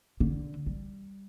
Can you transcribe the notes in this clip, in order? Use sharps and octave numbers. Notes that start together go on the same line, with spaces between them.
D3
G3